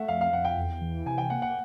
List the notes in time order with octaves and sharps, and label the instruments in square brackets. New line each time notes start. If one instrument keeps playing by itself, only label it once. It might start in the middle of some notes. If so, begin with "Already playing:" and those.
Already playing: [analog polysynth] A3 [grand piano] E5 F#5
[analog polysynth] F2 [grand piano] F5
[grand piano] F5
[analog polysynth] F2 [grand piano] F#5
[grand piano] G5
[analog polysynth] E2
E3
[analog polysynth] C3 [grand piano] G#5
[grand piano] G5
[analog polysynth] A#3 [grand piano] F#5
[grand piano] F#5